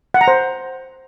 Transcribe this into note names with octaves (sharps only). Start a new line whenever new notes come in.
F#5
A#5
C5